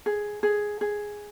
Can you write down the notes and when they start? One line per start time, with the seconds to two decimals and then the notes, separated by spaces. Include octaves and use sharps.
0.06 G#4
0.43 G#4
0.81 G#4